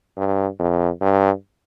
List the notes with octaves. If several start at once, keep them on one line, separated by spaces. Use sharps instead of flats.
G2
F2
G2